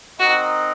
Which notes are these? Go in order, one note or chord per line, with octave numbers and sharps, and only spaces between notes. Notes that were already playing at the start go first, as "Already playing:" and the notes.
C4 D#4 F#4 A#4 D#5 F#5